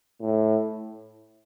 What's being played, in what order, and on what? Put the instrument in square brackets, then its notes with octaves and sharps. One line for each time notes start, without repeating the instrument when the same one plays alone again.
[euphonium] A2